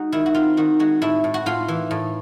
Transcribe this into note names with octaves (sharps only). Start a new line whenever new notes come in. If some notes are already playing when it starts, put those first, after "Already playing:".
Already playing: G#3 D#4 F#4
D#3 E4
F#4
C4 F4
D#3 F#4
G#3 F#4
A2 E4
A2
F#4
A2 F4
E3
A2